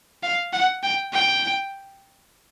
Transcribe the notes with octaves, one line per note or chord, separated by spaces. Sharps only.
F5
F#5
G5
G5